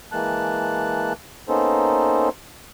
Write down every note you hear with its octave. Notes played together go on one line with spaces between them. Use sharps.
E3 G#3 A#3 A5 F#6
A#3 B3 C#4 D#4 A4 C5